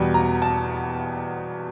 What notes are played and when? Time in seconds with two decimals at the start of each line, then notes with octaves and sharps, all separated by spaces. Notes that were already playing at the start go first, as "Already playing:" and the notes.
Already playing: E2 B2 G3
0.14 A#5
0.42 A5